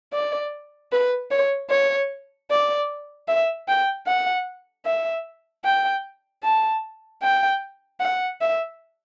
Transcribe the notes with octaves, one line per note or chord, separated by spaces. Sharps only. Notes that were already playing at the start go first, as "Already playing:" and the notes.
D5
B4
C#5
C#5
D5
E5
G5
F#5
E5
G5
A5
G5
F#5
E5